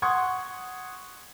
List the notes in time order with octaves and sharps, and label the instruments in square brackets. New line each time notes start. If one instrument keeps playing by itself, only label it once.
[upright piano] F#5 C6 C#6 D#6 G#6